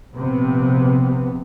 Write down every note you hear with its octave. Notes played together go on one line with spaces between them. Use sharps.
A#1 C3 B3